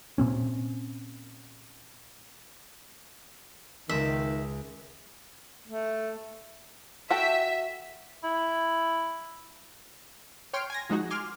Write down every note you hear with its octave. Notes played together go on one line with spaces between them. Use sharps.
A#2 C4 C#4
C#2 D#3 G#3 E5 E6
A3
F#4 A4 E5 G5
E4
C#5 G5 C6 F6 D7
G#5 G#6 A#6
F3 G#3 D#4 F#4
G#5 C6 D6 F6